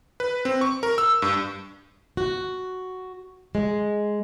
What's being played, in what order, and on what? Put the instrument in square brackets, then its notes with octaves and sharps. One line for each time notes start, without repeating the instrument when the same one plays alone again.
[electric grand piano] B4
C4
C#6
A#4
E6
G2
[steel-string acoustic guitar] F#4
G#3